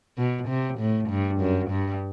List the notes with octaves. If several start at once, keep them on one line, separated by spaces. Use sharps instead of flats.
B2
C3
A2
G2
F#2
G2